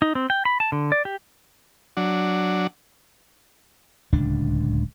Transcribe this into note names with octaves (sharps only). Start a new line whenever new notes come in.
D#4
C4
G5
B5
A5
D3
D5
G4
F#3 D4
D1 C#2 D4